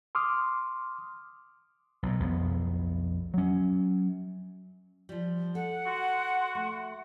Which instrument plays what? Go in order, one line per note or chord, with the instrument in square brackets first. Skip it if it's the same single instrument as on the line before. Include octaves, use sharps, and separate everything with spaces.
[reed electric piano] C6 D6 D#6 F6
[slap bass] B1 A#2
B1 F2 B3
F#3 C#4
[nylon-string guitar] F3 G3
[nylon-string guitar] A4 [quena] F#5
[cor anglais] F#4 [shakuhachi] C6
[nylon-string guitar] A3